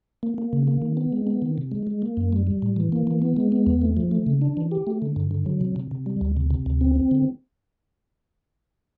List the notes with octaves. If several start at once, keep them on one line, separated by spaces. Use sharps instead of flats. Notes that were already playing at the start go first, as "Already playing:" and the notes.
A#3
A#3
C#3
A#3
D#3
B3
G#3
B3
D#3
C3
G#3
G#3
A#3
F#2
G3
G3
A2
E3
A#3
E3
B3
G#3
B3
E2
A3
F3
A3
C#3
D4
E3
G4
A3
D3
G2
D3
F#3
C3
C3
C3
G3
D2
C3
C3
D2
C4
C4
D3